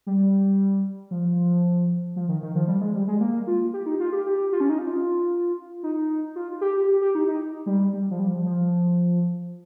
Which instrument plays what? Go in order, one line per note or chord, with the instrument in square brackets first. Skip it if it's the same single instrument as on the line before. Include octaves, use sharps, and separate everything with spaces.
[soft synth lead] G3
F3
F3
D#3
D#3
F3
G3
G#3
G3
G#3
A#3
F4
G4
D#4
F4
G4
G4
F4
C#4
D#4
F4
D#4
F4
G4
G4
G4
D#4
D#4
G3
G3
F3
G3
F3
F3